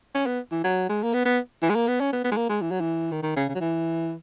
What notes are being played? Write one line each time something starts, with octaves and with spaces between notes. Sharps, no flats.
C#4
B3
E3
F#3
G#3
A#3
B3
B3
E3
G#3
A#3
B3
C#4
B3
B3
G#3
A#3
G#3
E3
F#3
E3
D#3
D#3
C#3
C#3
F#3
E3